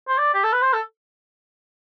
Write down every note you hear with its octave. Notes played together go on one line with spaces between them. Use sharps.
C5
D5
G4
A4
B4
C5
A4